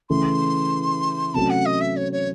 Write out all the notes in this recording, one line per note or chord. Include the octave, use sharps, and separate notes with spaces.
C#3 E3 A3 C6
C3 F#3 A3 C#4 A5
F#5
D#5
E5
C#5
C#5